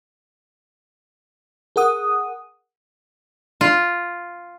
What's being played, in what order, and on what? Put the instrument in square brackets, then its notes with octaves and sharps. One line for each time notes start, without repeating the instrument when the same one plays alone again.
[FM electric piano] G#4 A#4 F#5 D#6
[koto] F4